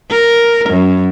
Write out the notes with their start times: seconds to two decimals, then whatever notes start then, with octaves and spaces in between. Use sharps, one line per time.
0.11 A#4
0.70 F#2